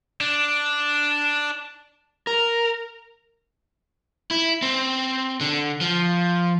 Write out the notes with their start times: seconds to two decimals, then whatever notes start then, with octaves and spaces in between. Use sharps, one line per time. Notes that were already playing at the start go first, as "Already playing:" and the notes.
0.20 D4
2.27 A#4
4.31 E4
4.62 C4
5.41 D3
5.81 F3